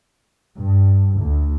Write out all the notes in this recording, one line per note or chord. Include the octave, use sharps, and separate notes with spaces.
G2
D2